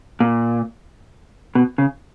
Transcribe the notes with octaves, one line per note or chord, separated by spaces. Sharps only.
A#2
B2
C#3